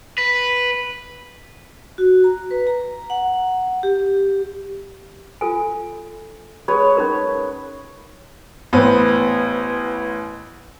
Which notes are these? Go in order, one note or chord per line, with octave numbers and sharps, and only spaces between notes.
B4
F#4
A#5
B4
A#5
F#5
G4
F4 A4 G#5
G#3 B4 C#5
C#4 D#4 A#4
A1 B3 B4 C5